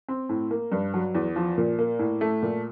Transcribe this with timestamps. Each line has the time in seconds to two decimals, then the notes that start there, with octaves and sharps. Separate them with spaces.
0.08 C4
0.29 A2
0.51 A#3
0.72 G2
0.94 F#3
1.15 E2
1.36 F3
1.57 A#2
1.79 A#3
1.99 A2
2.21 A3
2.42 A#2